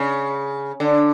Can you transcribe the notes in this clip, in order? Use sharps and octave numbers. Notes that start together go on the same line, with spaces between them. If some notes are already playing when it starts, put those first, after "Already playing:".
Already playing: C#3
D3